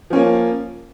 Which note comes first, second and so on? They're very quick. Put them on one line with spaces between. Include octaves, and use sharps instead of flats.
F3 C#4 A#3